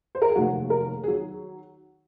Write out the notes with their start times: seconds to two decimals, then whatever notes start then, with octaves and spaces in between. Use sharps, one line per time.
0.15 C5
0.22 A#4
0.29 G#4
0.35 F1 D#2 D#3 F#3 F#4
0.70 A#4
1.04 G#4
1.06 D#3 F#3